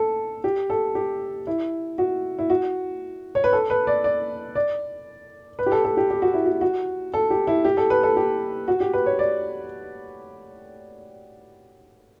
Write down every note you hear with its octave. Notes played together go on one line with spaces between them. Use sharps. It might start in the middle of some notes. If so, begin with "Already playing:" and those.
Already playing: A4
G4
A4
G4
E4
F#4
E4
F#4
C#5
B4
A4
B4
D5
D5
D5
B4
G4
A4
A4
G4
G4
F#4
E4
F#4
F#4
A4
G4
E4
G4
A4
B4
A4
G4
F#4
G4
B4
C#5
D5